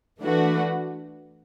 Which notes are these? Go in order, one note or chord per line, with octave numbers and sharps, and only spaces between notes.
E3 A3 D4 F#4 B4